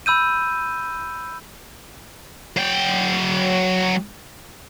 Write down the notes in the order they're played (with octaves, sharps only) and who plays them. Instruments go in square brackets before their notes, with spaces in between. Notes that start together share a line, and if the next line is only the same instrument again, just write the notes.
[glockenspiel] B5 E6 G6 D#7
[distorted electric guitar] F#3 G5